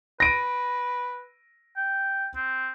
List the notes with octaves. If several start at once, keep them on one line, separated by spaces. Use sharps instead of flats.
B4 A#6 D7 D#7
G5
C4